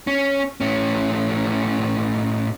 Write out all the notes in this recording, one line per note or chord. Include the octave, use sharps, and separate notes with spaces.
C#4
A2 C#4